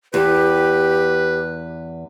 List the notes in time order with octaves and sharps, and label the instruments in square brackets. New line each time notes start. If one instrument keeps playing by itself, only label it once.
[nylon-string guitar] E2 [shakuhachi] G4 [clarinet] B4